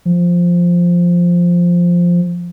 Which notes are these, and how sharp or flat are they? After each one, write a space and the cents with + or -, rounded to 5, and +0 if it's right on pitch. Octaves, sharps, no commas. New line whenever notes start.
F3 +0